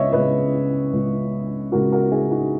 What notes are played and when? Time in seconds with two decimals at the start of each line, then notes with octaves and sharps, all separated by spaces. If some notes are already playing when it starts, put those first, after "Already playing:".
Already playing: C#2 C#3 G#3 B3 C#5 D#5 E5
0.12 C#2 C#3 G#3 B3 B4 D#5
0.93 C#2 C#3 G#3 B3
1.72 C#2 C#3 G#3 B3 F#4 A#4
1.92 F#4 A#4
2.12 E4 G#4
2.31 D#4 F#4